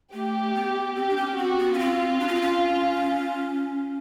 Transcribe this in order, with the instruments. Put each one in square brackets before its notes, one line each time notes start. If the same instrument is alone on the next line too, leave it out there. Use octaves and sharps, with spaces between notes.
[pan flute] A3 [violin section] G4
[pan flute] B3
[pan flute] C4 [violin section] G4
[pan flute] D4
C#4
[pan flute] C4 [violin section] F#4
[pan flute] B3
C#4
[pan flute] C4 [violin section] F4
[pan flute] D4
C#4
C4
C#4